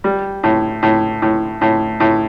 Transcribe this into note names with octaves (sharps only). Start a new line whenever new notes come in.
G3
A2
A2
A2
A2
A2